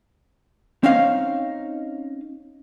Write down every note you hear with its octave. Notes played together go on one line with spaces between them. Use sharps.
C4 C#4 D#4 F5